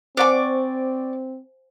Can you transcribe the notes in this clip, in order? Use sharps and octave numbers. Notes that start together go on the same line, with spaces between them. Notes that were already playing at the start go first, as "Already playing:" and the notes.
C4 C5 D5 F#5 G#5 C#6 D6